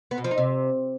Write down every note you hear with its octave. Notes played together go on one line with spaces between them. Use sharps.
B3
B2
F3
D#4
C3